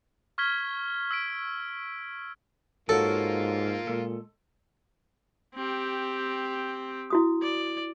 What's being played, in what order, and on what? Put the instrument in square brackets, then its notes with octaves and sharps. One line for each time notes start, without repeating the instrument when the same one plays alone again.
[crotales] C#6 F6 G#6 B6 G7
E6 B6 D7
[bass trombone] G#2 [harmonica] A#3 F4 [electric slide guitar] F#4 A#4 C#5 [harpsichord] A4
[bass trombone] A#2 [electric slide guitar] G#3 A4
[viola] C4 G4
[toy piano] E4 F#4 D#6
[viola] D5